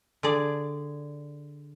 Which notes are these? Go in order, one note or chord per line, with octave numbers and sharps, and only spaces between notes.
D3 G#4 D5